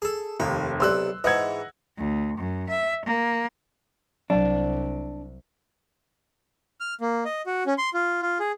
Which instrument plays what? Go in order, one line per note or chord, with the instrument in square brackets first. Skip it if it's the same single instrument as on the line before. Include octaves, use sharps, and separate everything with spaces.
[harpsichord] G#4 A4
[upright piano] F1 D#2 [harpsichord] A#3
[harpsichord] B1 C3 D5 [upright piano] C6 E6 F#6
[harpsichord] G#2 E3 [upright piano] D#5 F#5 G#6
[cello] D2
F#2
E5
A#3
[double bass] C2 [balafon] F#3 [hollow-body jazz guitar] D4
[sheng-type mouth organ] F6
A#3
D#5
F#4
C#4
C6
F4
F4
G#4